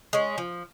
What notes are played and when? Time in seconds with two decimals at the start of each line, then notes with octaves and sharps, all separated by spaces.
0.13 G#3 C#4
0.38 F3